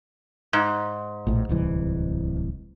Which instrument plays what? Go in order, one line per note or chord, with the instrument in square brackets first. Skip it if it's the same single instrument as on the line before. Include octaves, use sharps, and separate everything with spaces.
[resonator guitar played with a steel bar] G#2
[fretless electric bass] A#1 A2
D1 C2 E3